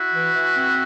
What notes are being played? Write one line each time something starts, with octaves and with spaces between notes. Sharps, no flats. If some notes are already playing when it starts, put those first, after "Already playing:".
Already playing: E4 F#4
E3
E3
C4